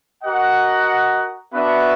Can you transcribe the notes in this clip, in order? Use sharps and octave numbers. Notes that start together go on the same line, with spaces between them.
F#4 A#4 D#5 F#5
B3 D4 F#4 B4 E5